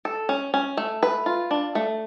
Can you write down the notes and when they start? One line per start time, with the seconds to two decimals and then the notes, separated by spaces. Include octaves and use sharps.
0.05 A4
0.29 C#4
0.54 C#4
0.77 A3
1.03 B4
1.26 F4
1.51 D4
1.75 A3